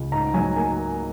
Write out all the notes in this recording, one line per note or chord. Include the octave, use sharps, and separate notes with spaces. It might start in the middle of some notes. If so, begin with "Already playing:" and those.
Already playing: C#2
G#2 A#5
F#3 G#5
A#3 G#5